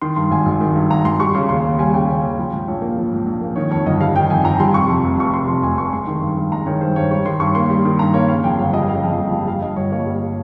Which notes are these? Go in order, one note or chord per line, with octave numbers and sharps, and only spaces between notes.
D#3 C6
G2 C6
G#1 G#5
G#1
D#3
G2
G#1 A#5
G#1 C6
G3 C#6
C#3 C6
D#2 C6
D#2
G3 G#5
C#3 G5
D#2
D#2
F3
G#2
A#1 C#5
A#3
F3
G#2
A#1
A#3
D#3 C#5
F2 C#5
G1 D#5
G3 F5
D#3 G5
F2 G#5
G1 A#5
G3 C6
C3 C#6
F2
F1
F1 C#6
C3 C6
F2 C6
F1 G#5
F1 C#6
G#3 C6
D#3
G2
G2
G#3 A#5
D#3 C#5
G2 C5
G2 C#5
G3 C#5
D#3 C6
G2 C#6
A#3 C6
G3
D#3
G2 A#5
A#3 C#5
C#3 F5
F2 G5
G1 F5
G3 D#5
C#3 F5
F2 G5
G1
G3
G3 F5
G2 D#5
G1 C#5
A#3 C#5
G3